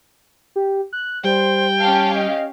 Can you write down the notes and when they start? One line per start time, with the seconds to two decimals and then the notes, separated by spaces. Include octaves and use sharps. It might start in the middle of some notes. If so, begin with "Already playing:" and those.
0.56 G4
0.93 F#6
1.24 G3 C5 G5
1.80 C#4 G4 F5 A5
2.14 D#5